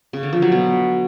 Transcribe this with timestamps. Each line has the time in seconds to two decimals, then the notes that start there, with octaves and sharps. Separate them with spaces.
0.13 C#3
0.23 D3
0.33 F3
0.42 F#3
0.52 B2